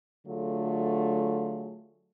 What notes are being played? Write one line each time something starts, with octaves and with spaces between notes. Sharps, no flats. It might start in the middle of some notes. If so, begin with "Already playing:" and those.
D3 F#3 A3 F4 G#4